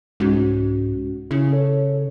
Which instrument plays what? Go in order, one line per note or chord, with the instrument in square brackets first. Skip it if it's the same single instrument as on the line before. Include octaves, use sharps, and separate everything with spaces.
[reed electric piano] C2 C#4 F#4 [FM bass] G#2
[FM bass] C#3 [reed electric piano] E4
[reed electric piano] A4 C#5